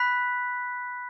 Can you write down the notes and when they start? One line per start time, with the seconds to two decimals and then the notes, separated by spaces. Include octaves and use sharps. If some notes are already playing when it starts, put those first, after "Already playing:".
Already playing: B5 F#6 B6